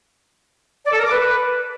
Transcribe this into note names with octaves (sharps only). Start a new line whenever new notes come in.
D5
A4
A#4
D6
B4